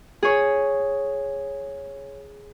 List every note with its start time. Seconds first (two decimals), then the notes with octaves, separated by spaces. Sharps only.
0.23 G#4 C#5